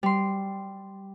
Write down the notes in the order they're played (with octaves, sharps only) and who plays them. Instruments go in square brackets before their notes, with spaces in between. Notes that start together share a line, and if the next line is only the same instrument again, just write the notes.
[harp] G3 C6